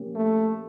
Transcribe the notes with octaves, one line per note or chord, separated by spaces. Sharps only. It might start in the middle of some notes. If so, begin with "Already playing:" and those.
Already playing: F3 A#3 C#4 G4
A3